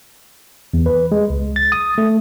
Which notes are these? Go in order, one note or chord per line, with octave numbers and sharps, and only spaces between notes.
E2
B4
G#3
C#2
A6
D#6
A3